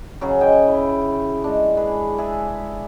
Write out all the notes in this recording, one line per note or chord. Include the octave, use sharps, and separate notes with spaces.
C#3 F#3 G#4
D#5 G5 G#5
E4
G#3 D4
G#4 B4
G#4 D5 E5